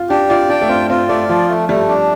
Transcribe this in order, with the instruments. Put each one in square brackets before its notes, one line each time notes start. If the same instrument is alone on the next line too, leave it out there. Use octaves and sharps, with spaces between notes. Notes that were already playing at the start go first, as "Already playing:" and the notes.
Already playing: [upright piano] F4
[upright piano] D4 [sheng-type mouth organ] G4
[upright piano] F4 [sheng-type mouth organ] D5
[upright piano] D4 [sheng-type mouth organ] G5
[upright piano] A3
[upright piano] C4 [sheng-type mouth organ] F4
[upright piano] C4 [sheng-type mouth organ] F4
[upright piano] A3 [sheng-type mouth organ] D5
[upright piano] F3 [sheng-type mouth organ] F4
[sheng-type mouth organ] A3
[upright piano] G3 [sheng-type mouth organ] A3
[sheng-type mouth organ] D4